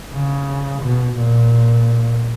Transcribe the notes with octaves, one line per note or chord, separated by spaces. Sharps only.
C#3
B2
A#2